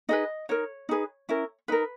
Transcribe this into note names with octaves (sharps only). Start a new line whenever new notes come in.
D#4 G#4 B4 D#5
D#4 A#4 C#5
D#4 G#4 B4
C#4 E4 A#4
D#4 A#4 B4